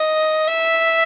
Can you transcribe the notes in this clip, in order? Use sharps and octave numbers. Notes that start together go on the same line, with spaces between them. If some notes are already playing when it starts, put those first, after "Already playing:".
Already playing: D#5
E5